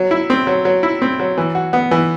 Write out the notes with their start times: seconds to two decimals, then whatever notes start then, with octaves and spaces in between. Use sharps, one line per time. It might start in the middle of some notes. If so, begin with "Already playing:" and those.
Already playing: F#3
0.11 E4
0.30 C4
0.47 F#3
0.65 F#3
0.83 E4
1.02 C4
1.19 F#3
1.38 E3
1.55 F#4
1.73 B3
1.91 E3